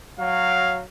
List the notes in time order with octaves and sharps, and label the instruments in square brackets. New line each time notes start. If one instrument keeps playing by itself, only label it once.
[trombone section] F#3 [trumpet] F5